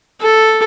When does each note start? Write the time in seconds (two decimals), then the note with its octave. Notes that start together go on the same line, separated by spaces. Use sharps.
0.21 A4